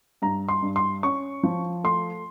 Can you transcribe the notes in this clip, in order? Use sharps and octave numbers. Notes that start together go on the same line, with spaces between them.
G2 A#5
C6
G2
C6
C#4 C#6
F3
A3 C6